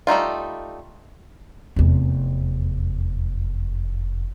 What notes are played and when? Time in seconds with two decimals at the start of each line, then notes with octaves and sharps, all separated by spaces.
0.07 G3 A3 D#4 F4
1.76 F1 E2